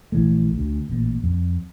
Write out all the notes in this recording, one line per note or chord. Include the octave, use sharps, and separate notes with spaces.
A#1 E3 A3
D2
A1 A#2
F2